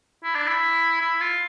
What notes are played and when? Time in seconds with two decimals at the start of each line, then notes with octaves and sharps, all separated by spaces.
0.24 E4
0.35 D4
0.47 E4
1.01 E4
1.20 F4